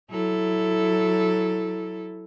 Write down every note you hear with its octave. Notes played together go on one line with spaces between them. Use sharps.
F#3 E4 A4